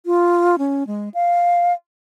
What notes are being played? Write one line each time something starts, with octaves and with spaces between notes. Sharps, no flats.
F4
C#4
G#3
F5